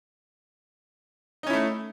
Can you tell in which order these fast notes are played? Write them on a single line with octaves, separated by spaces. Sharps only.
D#4 C#4 E4 A3